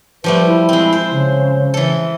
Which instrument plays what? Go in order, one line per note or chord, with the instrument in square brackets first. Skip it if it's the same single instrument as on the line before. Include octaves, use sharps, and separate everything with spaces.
[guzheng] F3 G3 A3 [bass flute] B4
[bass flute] E4
[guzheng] G#3 C4
C5
[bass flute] C#3
[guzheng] E3 A4